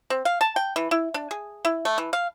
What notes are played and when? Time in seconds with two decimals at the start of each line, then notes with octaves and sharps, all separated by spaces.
0.10 C4
0.25 F5
0.41 A5
0.56 G5
0.76 E3
0.91 E4
1.14 D4
1.31 G#4
1.65 E4
1.85 A3
1.98 E3
2.13 F5